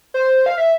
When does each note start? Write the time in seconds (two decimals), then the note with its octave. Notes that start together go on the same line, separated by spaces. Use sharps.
0.14 C5
0.46 F5
0.58 E5